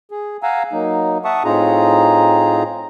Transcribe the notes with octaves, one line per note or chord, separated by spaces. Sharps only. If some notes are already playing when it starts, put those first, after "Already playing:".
G#4
F5 F#5 G#5 A#5 E6
F#3 A#3 D#4
E5 F#5 A5 C#6 D#6
A2 C4 D#4 F4 G#4 A#5